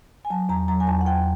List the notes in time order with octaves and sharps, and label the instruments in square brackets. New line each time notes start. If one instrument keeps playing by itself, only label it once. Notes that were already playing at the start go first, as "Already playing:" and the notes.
[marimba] G#5
F#3 A5
E2 A#5
F#3 A#5
G#5
E2 A5
F#5
E2 G5